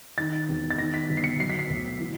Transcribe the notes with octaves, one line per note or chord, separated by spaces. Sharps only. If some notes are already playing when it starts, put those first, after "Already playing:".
D#3 A6
E1
A6
D#3 A#6
B6
G1
C7
C#7
F#3 C7
B6
C7
D2
E3